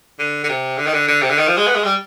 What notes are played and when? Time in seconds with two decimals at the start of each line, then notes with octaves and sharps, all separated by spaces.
0.19 D3
0.44 D3
0.49 C3
0.78 D3
0.86 D#3
0.93 D3
1.08 D3
1.22 C3
1.30 D3
1.38 D#3
1.47 F3
1.58 G#3
1.67 B3
1.75 G#3
1.84 G3